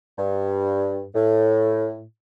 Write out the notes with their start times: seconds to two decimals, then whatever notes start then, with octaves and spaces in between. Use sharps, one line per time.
0.18 G2
1.15 A2